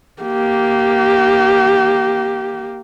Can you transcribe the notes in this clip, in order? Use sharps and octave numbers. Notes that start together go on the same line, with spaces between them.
A#3 G4